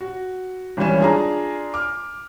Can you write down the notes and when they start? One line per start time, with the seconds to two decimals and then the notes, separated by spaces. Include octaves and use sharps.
0.01 F#4
0.77 G#1 E3 G3 C#4 E7
1.00 D4 F4 G#4 D5 A#5
1.74 D6 F6